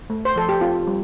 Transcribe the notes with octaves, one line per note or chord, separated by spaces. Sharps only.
A3
C5
F3 A4
G4
C4 F4
G3